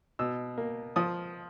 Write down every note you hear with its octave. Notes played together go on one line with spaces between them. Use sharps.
B2 E6
A#3
F3 D#6